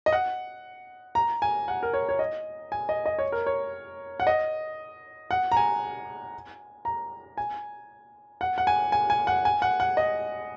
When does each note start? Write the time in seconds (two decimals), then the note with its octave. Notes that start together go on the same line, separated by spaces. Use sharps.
0.06 D#5
0.12 F#5
1.15 A#5
1.42 G#5
1.68 F#5
1.83 A#4
1.93 C#5
2.09 C#5
2.19 D#5
2.72 G#5
2.89 D#5
3.06 D#5
3.18 C#5
3.32 A#4
3.46 C#5
4.20 F#5
4.27 D#5
5.31 F#5
5.52 A#5
5.57 G#5
6.85 A#5
7.37 G#5
8.41 F#5
8.58 F#5
8.67 G#5
8.92 G#5
9.10 G#5
9.27 F#5
9.45 G#5
9.62 F#5
9.80 F#5
9.97 D#5